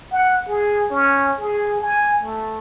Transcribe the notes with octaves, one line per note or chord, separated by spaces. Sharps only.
F#5
G#4
C#4
G#4
G#5
A3